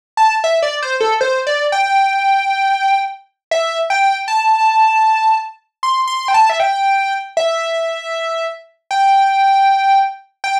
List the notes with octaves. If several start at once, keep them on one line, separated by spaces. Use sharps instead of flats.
A5
E5
D5
C5
A4
C5
D5
G5
E5
G5
A5
C6
C6
G5
A5
E5
G5
E5
G5
G5